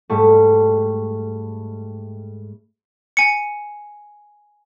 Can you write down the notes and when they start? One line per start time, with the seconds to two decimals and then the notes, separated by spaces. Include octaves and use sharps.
0.10 G#2 G3 A3
3.17 G#5 C#7